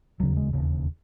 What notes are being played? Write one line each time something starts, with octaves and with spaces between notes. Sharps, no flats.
E1 D#2 C#3 F#3
G#3
E1 D#2 C#3